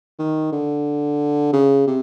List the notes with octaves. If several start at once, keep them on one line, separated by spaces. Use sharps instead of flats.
D#3
D3
C#3
C3